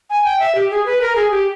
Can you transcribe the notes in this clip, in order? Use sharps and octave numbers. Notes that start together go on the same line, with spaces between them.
G#5
G5
E5
G4
G#4
B4
A#4
G#4
G4